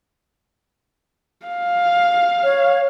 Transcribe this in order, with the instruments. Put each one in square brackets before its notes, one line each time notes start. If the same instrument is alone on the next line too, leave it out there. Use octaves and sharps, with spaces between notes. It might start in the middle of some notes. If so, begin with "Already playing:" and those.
[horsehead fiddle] F5
[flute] C#5